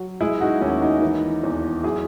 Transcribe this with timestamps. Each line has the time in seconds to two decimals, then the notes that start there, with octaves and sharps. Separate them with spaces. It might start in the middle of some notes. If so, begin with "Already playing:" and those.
Already playing: F#3
0.21 G#3 E4 G#4
0.41 D#4 F#4
0.61 D#2 C#4 E4
0.81 D#4 F#4
1.02 E3
1.44 E2
1.84 F#3 E4 G#4